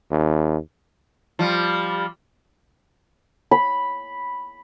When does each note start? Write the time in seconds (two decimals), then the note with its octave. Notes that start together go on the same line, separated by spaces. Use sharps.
0.11 D#2
1.39 F3 G3
3.51 B5